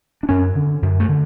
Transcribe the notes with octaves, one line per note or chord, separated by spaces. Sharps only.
D4
F#2 C#4
D3
F#2
A3
D3